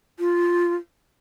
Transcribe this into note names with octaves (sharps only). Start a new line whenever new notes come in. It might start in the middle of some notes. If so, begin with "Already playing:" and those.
F4